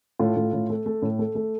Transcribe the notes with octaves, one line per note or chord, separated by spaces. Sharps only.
A2 F4 A4
A2
A2
A3
A3
A2
A3
A3